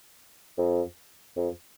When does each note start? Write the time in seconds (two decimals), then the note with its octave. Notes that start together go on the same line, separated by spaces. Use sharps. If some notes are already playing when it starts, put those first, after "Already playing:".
0.58 F2
1.37 F2